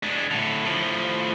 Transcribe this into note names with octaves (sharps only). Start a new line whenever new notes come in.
G#3 D4
A2 D3
A2 F3